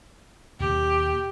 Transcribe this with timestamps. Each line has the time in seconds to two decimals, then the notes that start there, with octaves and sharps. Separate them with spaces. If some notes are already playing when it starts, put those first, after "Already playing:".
0.60 D#2 B2 A#3 G4